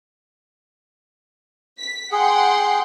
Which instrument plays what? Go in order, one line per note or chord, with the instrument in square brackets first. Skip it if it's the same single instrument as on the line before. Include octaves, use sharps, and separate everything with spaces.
[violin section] B6
[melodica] G#4 [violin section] F#5 G5 C6